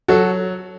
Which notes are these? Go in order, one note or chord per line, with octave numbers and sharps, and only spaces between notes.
F#3 F#4 A4